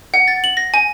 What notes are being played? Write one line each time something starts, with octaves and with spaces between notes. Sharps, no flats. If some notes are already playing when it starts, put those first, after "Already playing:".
F#5
A6
F#7
A#6
G#5